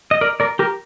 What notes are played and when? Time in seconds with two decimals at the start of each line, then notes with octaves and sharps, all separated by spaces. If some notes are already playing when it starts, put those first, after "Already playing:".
0.11 D#5
0.21 A#4 D5
0.40 A#4 D5
0.59 G4 A#4